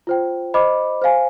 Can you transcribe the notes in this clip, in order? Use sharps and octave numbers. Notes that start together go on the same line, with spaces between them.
F4 C5 G5
C5 D#5 B5 D6
C5 F5 G#5